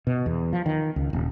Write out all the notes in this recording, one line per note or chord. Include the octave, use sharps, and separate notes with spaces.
B2
E2
F3
D#3
C#2
D#1